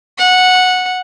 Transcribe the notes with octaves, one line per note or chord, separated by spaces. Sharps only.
F#5